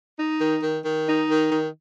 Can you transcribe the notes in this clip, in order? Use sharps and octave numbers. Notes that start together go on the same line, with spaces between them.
D#4
D#3
D#3
D#3
D#4
D#3
D#3